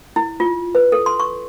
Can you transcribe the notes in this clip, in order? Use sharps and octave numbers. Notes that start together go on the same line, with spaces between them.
E4
F4
B4
A4
C6
C#6